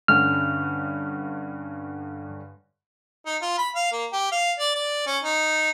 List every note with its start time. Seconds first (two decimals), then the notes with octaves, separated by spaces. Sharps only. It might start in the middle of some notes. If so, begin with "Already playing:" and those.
0.08 G2 D3 C#4 F6
3.26 D#4
3.42 F4
3.58 B5
3.75 F5
3.92 A#3
4.12 G4
4.32 F5
4.59 D5
4.75 D5
5.06 C#4
5.23 D#4